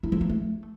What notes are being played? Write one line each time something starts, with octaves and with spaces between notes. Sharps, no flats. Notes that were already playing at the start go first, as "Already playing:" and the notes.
E4
F3
A#3
A3